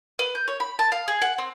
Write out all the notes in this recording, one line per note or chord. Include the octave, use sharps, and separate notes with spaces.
B4
G6
C#5
B5
A5
F5
G#4
F#5
C4